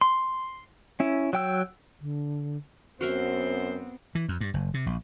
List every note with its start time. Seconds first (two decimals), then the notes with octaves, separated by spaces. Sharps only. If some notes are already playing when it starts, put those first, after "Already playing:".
0.01 C6
1.00 C#4 E4
1.33 F#3 G5 E6
2.01 D3
3.01 F#2 B3 C4 F#4 A#4 C5 E5
4.15 E3
4.29 F2
4.41 G2
4.54 F#1
4.74 C3
4.86 A#1